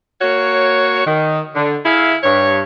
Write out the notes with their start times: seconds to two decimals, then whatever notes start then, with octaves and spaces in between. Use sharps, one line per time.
0.21 A#3 F#4 C#5
1.05 D#3
1.55 D3
1.85 E4 G#4 E5 F5
2.24 G2 C#5